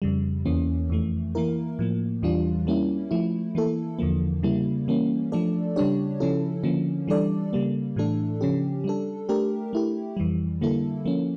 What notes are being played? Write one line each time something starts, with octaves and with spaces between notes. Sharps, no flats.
F2 C#3 G3
E2 E3 A#3 C#4
F2 E3 A3
E3 A#3 E4 A#4
A2 F3 A#3
E2 E3 G3 D4 F4
G3 A#3 C#4 E4
F3 A3 E4
E3 A#3 E4 A4
E2 D3 F3 A#3
C#3 G3 A#3 E4
E3 G3 A#3 C#4
F3 A3 D4 A4 D5
C#3 G3 D4 G4 C#5
C#3 F3 C#4 E4 A4
D3 F3 A#3 C#4
E3 G3 D4 A4 D5
C#3 G3 A#3
A2 E3 A3 D4 A4
C#3 F3 C#4 G4
G3 D4 A4
A3 D4 G4 A#4
A3 E4 G4
F2 E3 G3
D3 G3 A#3 E4 A4
F3 A#3 C#4